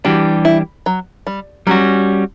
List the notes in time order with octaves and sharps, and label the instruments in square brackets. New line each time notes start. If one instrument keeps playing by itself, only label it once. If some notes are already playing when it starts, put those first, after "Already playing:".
[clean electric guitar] E3 G3 D4 G4 [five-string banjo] F#4
[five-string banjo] E4
F#3
G3
[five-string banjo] F#3 [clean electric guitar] G3 C#4 F#4